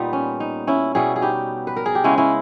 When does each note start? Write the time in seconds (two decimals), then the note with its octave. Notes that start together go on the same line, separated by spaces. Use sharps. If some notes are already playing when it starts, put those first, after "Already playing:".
Already playing: A#2 G3 B3 D#4
0.13 C#4
0.40 D#4
0.67 C#4 E4
0.95 B2 G3 B3 E4 G#4
1.16 G#4
1.22 D#4 G4
1.67 B4
1.76 A#4
1.86 G#4
1.95 G4
2.04 C#3 G#3 B3 C#4 E4
2.18 C#4 E4